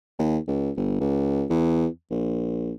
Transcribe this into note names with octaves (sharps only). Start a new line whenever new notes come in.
D#2
C#2
G1
C#2
E2
A#1